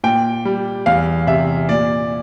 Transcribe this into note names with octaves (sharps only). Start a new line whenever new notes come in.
A#2 G5
G3
E2 F5
C3 E5
A#2 D5